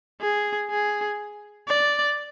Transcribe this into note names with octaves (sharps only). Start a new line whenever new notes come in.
G#4
G#4
D5